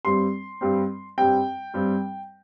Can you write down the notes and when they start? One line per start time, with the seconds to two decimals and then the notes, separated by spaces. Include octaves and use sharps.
0.05 G2 G3 C4 C6
0.61 G2 G3 C4
1.18 G2 G3 C4 G5
1.74 G2 G3 C4